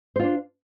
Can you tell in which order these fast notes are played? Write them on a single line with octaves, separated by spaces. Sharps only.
C5 F4 D4